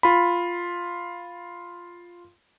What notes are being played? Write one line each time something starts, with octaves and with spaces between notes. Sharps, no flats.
F4 B5